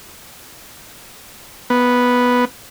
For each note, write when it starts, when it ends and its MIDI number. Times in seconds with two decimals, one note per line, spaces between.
1.70 2.45 59